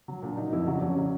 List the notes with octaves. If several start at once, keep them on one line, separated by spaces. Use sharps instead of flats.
F#3
A#2 D4
F#3 D#4
F2 E4
C#3 F#3 F#4
D4
F2 C#4
C#3 F#3